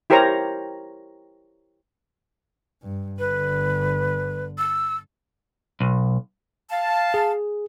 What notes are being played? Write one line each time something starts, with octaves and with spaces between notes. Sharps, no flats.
E4 G4 A#4 C5 C#5 A#5
G2
G1 D3 B4
E6
B1
F5 A5
G#4